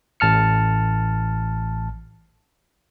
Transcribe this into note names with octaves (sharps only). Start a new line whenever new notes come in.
A1 A5 F6 C#7